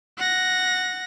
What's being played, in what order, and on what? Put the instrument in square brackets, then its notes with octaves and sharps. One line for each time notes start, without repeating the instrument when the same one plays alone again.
[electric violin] F#5 A#6